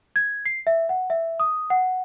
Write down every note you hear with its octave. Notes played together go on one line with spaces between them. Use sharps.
G#6
C7
E5
F#5
E5
D#6
F#5